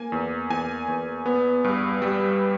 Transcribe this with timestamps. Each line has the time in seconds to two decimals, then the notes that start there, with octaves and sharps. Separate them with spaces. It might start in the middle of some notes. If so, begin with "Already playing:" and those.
Already playing: A#3 G#5
0.12 E2
0.50 E2 G#5
0.88 E2
1.26 B3
1.64 G2
2.02 G3